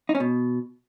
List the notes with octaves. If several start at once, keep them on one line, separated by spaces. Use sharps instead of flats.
D#4
C#4
B2